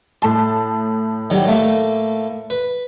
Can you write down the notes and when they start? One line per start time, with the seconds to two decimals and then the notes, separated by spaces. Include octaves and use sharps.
0.22 A2 A5 C6
1.30 D#3 F#3 G3
1.48 A3 A#3
2.50 B4